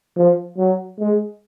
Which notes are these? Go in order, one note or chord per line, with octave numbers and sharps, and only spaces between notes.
F3
F#3
G#3